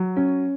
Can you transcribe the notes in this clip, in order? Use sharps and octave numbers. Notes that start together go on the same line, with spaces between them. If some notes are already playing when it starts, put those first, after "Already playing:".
Already playing: F#3
C#4